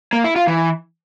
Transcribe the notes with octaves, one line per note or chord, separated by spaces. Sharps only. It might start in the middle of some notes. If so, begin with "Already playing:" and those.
A#3
E4
F4
E3